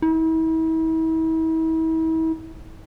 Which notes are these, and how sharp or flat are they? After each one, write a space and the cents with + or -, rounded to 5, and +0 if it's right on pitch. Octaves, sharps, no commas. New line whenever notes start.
E4 -40